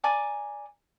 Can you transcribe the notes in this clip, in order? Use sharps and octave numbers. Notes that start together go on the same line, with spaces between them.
D5 G#5 A#5 D6